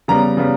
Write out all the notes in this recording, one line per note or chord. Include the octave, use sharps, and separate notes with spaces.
C#3 G3 B3 A#5
C#3 G3 B3